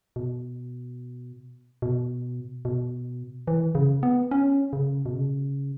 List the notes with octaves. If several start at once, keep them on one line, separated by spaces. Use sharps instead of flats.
B2
B2
B2
E3
C#3
B3
C#4
C#3
B2
C#3